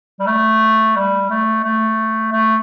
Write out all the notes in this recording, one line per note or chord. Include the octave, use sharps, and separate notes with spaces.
G3
A3
G3
A3
A3
A3